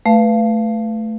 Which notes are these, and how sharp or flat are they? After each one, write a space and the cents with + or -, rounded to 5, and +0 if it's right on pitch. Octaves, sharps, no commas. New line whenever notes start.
A3 +0 B4 +0 F5 -25